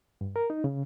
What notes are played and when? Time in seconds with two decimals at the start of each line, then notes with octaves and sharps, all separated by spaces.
0.21 G2
0.36 A#4
0.50 D#4
0.64 C#3